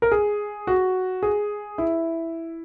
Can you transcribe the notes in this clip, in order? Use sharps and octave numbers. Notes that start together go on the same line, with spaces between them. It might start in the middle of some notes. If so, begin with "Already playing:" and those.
A#4
G#4
F#4
G#4
E4